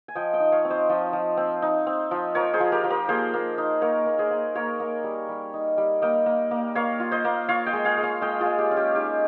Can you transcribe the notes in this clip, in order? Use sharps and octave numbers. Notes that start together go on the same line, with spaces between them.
G#5
F3 D#5 G5
D#5 G5
D#4
C#5 F5
C4
C5 D#5
F3
F3
C4
D#4
C4
F3
F3 A#4 C#5
G#4 C5
F3
G4 A#4
F3
G4 A#4
A#3 G#4 C5
A#3
D#4
A#3 A#4 C#5
A#3
G#4 C5
A#3
A#3 A#4 C#5
A#3
G3
G3
D#4
G3
A#3 D#5 G5
A#3
A#3
A#3 C#5 F5
F4
C5 D#5
A#3
F4 C#5 F5
D#5 G5
G#3
F5 G#5
G#3
C#5 F5
G#3 D#5 G5
F4 G#4
G#3
G4
C#4
G4
D#4 G4